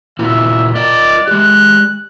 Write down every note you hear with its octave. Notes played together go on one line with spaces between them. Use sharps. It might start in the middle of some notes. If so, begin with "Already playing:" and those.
A#2 E4 F#4 E5
F4 A#4 D5 D#5
G#3 G4 F#6